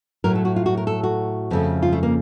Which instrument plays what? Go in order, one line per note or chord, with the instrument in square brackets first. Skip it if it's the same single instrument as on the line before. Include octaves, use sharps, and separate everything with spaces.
[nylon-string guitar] A2 F#3 A3 A#4
A4
F#4
F4
F#4
A#4
A4
F#4
F2 C#3 A3
F4
A3
A#3